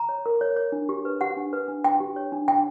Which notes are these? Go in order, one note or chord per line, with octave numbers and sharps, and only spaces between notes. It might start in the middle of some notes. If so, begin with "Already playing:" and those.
Already playing: A#5
C#5
A#4
C#5
C#5
D4
G4
B4
G4 F#5
D4
B4
D4
D4 G5
G4
C#5
D4
D4 G5